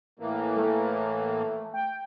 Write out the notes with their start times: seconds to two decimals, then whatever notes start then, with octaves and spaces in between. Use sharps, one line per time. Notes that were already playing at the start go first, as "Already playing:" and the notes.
0.19 A2 E3 A#3
0.57 A3
1.74 G5